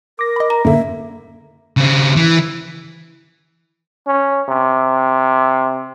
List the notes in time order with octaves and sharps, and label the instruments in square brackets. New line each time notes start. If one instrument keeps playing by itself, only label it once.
[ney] A#4 [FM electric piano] D6 A#6
[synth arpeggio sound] D#5 B5
[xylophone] A#5
[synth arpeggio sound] F#2 A2 D3 [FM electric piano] A#3 [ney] E5
[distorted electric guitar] C#3 C4
E3
[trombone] C#4
C3